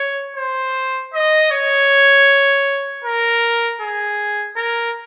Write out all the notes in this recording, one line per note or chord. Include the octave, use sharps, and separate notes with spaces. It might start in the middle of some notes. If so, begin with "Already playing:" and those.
Already playing: C#5
C5
D#5
C#5
A#4
G#4
A#4